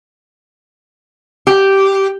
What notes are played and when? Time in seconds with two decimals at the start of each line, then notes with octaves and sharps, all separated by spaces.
1.47 G4